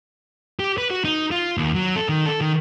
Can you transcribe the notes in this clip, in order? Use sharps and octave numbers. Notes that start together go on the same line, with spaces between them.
G4
B4
F#4
D#4
F4
D#2
F#3
A4
D#3
A4
D#3